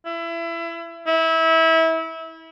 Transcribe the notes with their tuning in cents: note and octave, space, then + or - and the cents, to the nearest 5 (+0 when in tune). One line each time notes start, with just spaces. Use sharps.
E4 +25
E4 -25